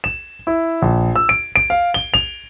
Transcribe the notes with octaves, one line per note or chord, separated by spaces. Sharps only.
E7
E4
A#1
E6
D7
D7
F5
G7
F7